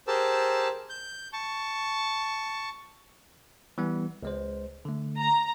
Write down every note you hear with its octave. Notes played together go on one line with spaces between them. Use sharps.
G4 G#4 A#4 C5 A5 E6
G6
A5 C#6
E3 G3 B3
C#2 G#3 C5
D3 A3
A#5